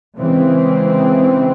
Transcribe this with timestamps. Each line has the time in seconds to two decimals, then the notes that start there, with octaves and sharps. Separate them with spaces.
0.17 C#3 E3 G#3 C4